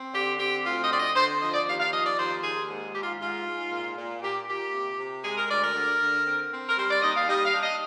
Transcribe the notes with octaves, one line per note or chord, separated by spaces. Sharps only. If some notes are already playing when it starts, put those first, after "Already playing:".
Already playing: C4
D3 G4
C4 G4
D2 F4
D#5
D3 D5
D#5
D3 C5
F3 D#5
D5
D#2 F5
F5
F3 D#5
D5
D#2 C5
D#2 G#4
G#2
G#2 G4
F4
G#2 F4
G#2
A#2
A#2
A#2 G4
A#2 G4
C3
C3
G#3 G#4
A#4
D2 D5
A#4
D3
D3
C4
C4
A#4
G3 C5
D5
D#2 D#5
F5
G3 D#5
F5
D4
D#5